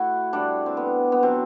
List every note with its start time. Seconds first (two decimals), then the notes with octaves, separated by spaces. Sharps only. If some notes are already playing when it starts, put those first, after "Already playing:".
Already playing: A2 E4 F#4
0.33 A2 G3 D4
0.66 C4
0.77 B3
1.12 B3
1.23 B2 F#3 C4